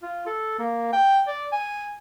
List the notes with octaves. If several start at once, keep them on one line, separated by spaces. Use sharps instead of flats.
F4
A4
A#3
G5
D5
G#5